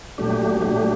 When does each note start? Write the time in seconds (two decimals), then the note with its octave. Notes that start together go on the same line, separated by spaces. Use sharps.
0.18 A#2 F#3 A3 D4 G4
0.61 A#2 F#3 A3 D4 G4